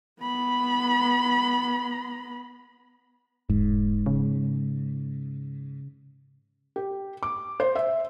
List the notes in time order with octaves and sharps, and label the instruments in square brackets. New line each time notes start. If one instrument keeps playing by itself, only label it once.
[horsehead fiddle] B3 B5
[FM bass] E1 [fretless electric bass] G#2
[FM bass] C#3
[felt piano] G4
D6
C5
E5